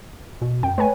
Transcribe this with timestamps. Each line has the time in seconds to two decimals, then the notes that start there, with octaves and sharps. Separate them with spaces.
0.41 B2
0.63 F#2 G5
0.78 A3 B4 C#5 G#5